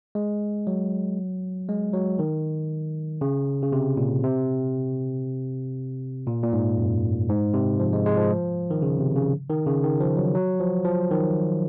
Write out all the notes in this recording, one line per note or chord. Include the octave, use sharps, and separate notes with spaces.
G#3
F#3
G#3
F#3
D#3
C#3
C#3
C3
A#2
C3
A#2
A#2
G#2
F#2
G#2
C3
F3
G#3
G#3
F3
D#3
C#3
C3
C#3
D#3
C#3
D#3
F3
F#3
F#3
F3
F3
D#3